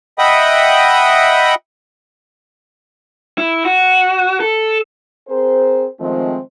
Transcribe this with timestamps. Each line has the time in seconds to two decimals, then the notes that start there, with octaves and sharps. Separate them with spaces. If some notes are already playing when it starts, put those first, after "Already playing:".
0.18 D#5 E5 F#5 G5 B5 D#6
3.38 E4
3.65 F#4
4.40 A4
5.28 C4 G#4 A#4 C5
5.99 D#3 F3 G#3 A3 C4